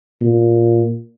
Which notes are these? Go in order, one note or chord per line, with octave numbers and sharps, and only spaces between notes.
A#2